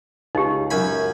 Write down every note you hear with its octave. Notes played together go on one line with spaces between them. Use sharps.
C#2 D#4 G4
F#2 G#5 B5